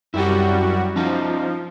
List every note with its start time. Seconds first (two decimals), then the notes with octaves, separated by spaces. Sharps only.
0.14 F#2 G3 E4 F#4 G4
0.96 F3 C#4 D#4